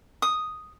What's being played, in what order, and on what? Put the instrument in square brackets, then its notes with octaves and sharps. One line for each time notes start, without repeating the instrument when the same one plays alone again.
[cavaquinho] D#6